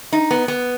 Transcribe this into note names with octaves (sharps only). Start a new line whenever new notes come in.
D#4
B3
B3